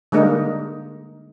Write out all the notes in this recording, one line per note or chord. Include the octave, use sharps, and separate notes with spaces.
D3 G3 G#3 A#3 D#4